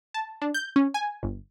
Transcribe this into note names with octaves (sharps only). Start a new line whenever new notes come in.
A5
D4
G6
C#4
G#5
G1